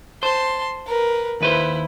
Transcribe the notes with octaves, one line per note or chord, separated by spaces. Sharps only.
C5 A5 C6
A#4 B4
D#2 E4 B4 C5